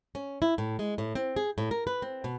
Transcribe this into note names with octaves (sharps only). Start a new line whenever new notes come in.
C#4
E4
A2
G#3
A2
C4
G#4
A2
A#4
B4
C4
B2